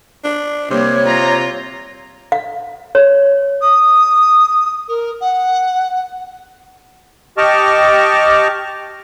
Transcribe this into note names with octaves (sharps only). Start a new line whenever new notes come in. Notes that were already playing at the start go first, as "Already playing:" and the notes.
D4
C3 G3 A#3 C#5
F4 A#5
F5
C#5
D#6
A#4
F#5
G4 D#5 A5 C#6 D6 F6